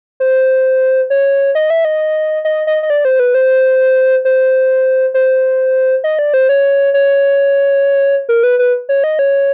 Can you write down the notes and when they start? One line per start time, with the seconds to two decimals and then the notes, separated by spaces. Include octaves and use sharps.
0.20 C5
1.10 C#5
1.55 D#5
1.70 E5
1.85 D#5
2.45 D#5
2.67 D#5
2.83 D#5
2.90 D5
3.05 C5
3.20 B4
3.34 C5
4.25 C5
5.14 C5
6.04 D#5
6.19 D5
6.34 C5
6.49 C#5
6.94 C#5
8.29 A#4
8.43 B4
8.59 B4
8.89 C#5
9.04 D#5
9.19 C#5